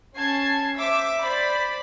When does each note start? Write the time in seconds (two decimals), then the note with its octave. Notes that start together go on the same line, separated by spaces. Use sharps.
0.15 C#4 A5 G#6 C7
0.75 C5 E5 D6 E6
1.20 C5 D5 B5